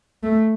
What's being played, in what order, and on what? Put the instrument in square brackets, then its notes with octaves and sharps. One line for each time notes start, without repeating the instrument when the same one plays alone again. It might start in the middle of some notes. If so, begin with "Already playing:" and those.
[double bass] A3